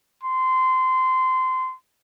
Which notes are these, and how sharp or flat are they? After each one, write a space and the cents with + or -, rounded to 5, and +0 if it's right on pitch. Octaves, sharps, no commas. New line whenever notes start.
C6 -20